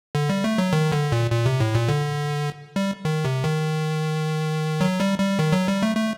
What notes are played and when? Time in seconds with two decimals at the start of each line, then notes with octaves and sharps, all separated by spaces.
0.15 D3
0.29 G3
0.44 A3
0.58 F#3
0.73 D#3
0.92 D3
1.12 A#2
1.31 A#2
1.46 C3
1.60 A2
1.75 A#2
1.89 D3
2.76 G3
3.05 D#3
3.25 C3
3.44 D#3
4.81 F#3
5.00 G3
5.19 G3
5.39 D#3
5.52 F#3
5.68 G3
5.82 A3
5.97 A3